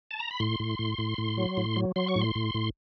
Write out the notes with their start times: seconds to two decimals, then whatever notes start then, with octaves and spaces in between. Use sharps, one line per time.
0.11 A5
0.20 A#5
0.31 B5
0.40 A2 C6
0.60 A2
0.79 A2
0.98 A2
1.18 A2
1.37 F#3
1.57 A2
1.76 F#3
1.96 F#3 C6
2.08 C#6
2.16 A2
2.21 C6
2.35 A2
2.54 A2